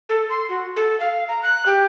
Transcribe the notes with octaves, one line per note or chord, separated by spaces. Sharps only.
A4
C6
F#4
A4
F5
A#5
F#6
G4